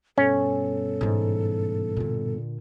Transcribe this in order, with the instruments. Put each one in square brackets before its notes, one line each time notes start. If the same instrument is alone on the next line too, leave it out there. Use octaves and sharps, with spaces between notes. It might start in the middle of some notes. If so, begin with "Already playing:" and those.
[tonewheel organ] G2 B2 [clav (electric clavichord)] C#4 [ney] A4
[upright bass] G#2 E3
A#2 D3